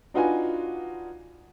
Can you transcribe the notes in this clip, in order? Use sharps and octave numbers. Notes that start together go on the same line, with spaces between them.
D4 D#4 F4 F#4 B4 G#5